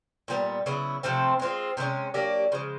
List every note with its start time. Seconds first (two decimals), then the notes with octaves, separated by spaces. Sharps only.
0.28 A#2 G3 B3
0.66 C#3 F#3 B3 E4
1.03 C3 F3 A3 C4
1.40 G#3 C4 F4
1.77 C3 E3 G#3 C#4
2.14 F#3 A#3 D4 G4
2.52 C#3 F3 G#3